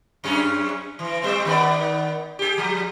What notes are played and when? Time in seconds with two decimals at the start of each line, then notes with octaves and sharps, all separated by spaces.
0.24 F#2 C#4 G#4
0.99 E3
1.22 G3 A3 C4
1.45 D#3 B3 D5
2.39 G4 G#4
2.58 F3